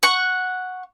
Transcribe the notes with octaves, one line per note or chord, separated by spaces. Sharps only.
F#5 C#6